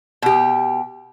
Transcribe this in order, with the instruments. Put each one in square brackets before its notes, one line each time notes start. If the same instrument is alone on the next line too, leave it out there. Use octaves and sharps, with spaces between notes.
[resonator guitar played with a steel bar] B2 G4